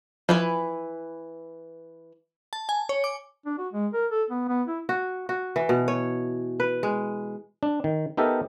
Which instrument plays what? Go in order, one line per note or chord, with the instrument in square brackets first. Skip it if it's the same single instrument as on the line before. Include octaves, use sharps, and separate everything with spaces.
[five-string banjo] E3 B4 G#5 [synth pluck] F3
[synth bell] A5
G#5
C#5
D6
[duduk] D4
F#4
G#3
A#4
A4
B3
B3
E4
[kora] F#4
F#4
E3
B2
C#5
B4
G#3
[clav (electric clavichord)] D4
D#3
B3 D#4 G4 A4 A#4 E5